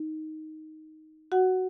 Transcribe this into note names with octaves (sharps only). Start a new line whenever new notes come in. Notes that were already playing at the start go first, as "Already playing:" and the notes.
Already playing: D#4
F#4 F#5